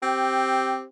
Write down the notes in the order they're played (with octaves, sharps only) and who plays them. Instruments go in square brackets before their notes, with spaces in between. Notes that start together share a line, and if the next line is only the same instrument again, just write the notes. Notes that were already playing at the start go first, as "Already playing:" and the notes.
[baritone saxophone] C4 [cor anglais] G4